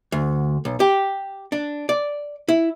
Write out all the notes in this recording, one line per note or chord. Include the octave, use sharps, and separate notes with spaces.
D2
B1
G4
D4
D5
E4